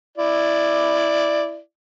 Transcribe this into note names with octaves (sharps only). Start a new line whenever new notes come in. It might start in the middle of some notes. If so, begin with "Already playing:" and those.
E4 D5